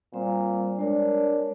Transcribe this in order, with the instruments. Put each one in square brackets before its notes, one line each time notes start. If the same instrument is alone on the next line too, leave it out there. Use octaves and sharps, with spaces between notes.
[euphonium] A#2 [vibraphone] G3 C4 C5
[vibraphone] G#3 A#4 C#5 [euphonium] D4